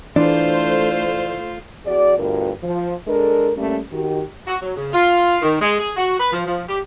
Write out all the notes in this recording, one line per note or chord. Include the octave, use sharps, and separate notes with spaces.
E3 A3 D4 F4 C5
E2 F#4 G#4 D5
D2 G2 B2 F4 A#4
F3
G#3 D4 A4 A#4
G3 A3 A#3 C#4
D#3 F#4 G4
F#4
F#3
C#3
F4
D#3
G#3
G#4
F#4
B4
F3
F3
G4